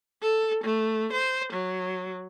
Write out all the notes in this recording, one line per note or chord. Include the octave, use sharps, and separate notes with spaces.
A4
A3
C5
F#3